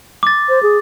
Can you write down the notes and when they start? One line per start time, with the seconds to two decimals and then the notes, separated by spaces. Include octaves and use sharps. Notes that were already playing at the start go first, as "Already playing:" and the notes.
0.23 D6 A6
0.49 C5
0.63 G#4